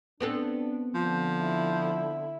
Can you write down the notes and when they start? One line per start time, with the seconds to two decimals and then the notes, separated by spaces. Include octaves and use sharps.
0.20 B3 C4 D4 A4
0.95 D3 F3
1.41 E4